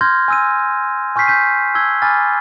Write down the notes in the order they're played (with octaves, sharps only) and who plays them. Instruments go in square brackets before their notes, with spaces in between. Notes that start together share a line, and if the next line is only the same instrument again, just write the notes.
[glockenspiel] C6 F6 G6 G#6 A#6
G#5 E6 D#7
G#5 C#6 F6 G6 B6 C7
G6 B6 D#7
A5 E6 G#6 G7
G#5 B5 D6 F6 A6